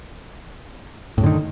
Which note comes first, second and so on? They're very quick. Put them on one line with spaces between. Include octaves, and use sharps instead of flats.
A2 F#2 D3 D#3